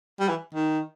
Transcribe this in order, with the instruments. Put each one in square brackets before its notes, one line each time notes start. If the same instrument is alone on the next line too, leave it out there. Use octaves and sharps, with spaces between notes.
[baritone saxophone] G3
E3
D#3